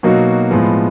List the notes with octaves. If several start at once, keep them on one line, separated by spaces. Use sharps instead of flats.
B2 F#3 A#3 D#4 F#4
A2 F3 G#3 B3